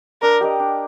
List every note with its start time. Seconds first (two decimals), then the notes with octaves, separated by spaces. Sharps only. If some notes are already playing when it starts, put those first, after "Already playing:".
0.22 D4 A#4
0.41 G4 A#4 D#5
0.59 D4